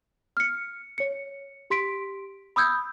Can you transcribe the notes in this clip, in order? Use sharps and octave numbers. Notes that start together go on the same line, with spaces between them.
F6 C#7
C#5 C#7
G4 C6 B6 D7
B5 D#6 E6 G6 G#6